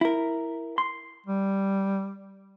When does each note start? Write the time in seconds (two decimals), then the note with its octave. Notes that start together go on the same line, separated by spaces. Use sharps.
0.01 E4 A#4
0.78 C6
1.26 G3